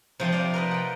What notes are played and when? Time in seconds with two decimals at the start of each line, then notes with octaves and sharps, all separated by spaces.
0.20 C3 F3 C4 C5
0.32 D5 F5
0.54 A#4 B4 D5 D#5
0.71 F#5 G5